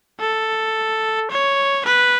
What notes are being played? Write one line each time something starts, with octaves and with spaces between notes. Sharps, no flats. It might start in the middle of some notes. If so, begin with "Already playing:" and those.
A4
C#5
B4